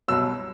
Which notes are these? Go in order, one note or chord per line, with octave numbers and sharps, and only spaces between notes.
C2 B2 F#3 E6